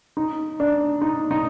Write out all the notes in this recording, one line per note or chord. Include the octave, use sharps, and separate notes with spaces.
D#4
D4
D#4
D#4